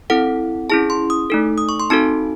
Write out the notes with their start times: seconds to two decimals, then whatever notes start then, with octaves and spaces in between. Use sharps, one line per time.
0.10 C4 E4 A4 F#5
0.70 C#4 E4 G#4 A5
0.90 C6
1.10 D#6
1.30 A3 D#4 A4
1.58 D#6
1.69 C#6
1.80 C6
1.90 C4 D#4 F#4 A4 A5